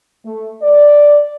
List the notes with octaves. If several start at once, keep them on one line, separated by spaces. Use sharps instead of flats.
A3
D5